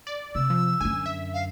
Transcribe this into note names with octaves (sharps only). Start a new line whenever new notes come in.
D5
C3 E6
F3
F#2 D3 G#5
E5
F5